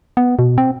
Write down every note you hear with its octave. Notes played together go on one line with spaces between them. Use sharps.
B3
B2
C4